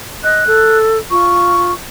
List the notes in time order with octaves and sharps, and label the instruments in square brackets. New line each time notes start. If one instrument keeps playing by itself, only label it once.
[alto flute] D#5 [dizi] F#6
[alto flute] A4
[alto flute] F4 [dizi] C#6